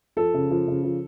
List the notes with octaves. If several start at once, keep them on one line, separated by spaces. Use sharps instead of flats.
F3 A4
C#3
F3
C#3
F3